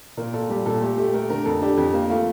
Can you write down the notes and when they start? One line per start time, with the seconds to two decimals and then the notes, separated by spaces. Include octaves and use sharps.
0.17 A#2 A#4
0.33 A#2 A4
0.50 G3 G4
0.66 A#2 A4
0.82 A3 G4
0.98 A3 G4
1.14 A3 A#4
1.30 D3 A#4
1.46 F2 A4
1.62 D4 G4
1.77 F2 G4
1.93 A#3
2.10 A3 F4